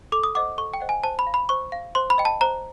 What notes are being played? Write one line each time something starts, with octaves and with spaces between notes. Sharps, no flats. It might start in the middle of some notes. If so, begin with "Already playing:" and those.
A4 D6
D#6
C5 D#5 F#5 D6
A4 C#6
G5
C5 D#5 F#5
G#5
C5 A5
B5
F5
B5
C5 C#6
F5
C5 C6
B5
D#5 G5
A5
C5 A#5